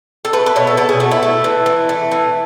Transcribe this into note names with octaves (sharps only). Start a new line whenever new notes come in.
A4
A3 B4
B4
B2 C#5
A4
B2 A4
G#4
A3 F#4
E4
A3
E3
E3
A3
E3